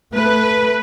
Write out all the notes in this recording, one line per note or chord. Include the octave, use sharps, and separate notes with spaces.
A3 B4